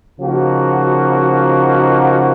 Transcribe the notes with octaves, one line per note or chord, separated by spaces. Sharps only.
C#3 F3 A#3 D#4 F#4